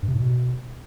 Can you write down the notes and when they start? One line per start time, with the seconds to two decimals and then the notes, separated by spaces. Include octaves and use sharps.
0.03 G2
0.08 C3
0.14 G#2
0.20 B2